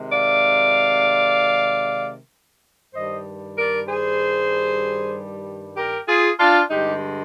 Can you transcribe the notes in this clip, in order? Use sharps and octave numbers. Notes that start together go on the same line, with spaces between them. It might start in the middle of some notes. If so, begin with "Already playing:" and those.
Already playing: C3 D#3 G#3
D5 F5
G2 D#3 G3 C5 D#5
A#4 D5
G#4 C5
G4 A#4
F4 G#4
D4 F4
G2 D3 G#3 D#4 G4